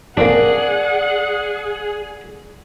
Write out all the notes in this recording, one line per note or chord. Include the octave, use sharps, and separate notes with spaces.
A#3 C4 D4 G#4 D5 F#5